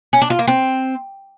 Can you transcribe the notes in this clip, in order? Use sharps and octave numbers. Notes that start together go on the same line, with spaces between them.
C#4
D4
F4
A#3
C4